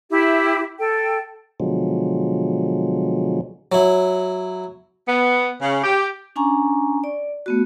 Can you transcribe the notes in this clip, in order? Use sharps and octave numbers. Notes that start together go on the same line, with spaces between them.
E4 G4
A4 G5
B2 D3 F3 F#3 G#3
F#3 E4
B3
C#3
G4
C#4 D4 G#5 A#5 C#6
D5
A3 B3 F#4